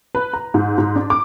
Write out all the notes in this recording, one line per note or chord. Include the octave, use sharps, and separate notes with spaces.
B4
A#5
G#2
G#2
D4
D6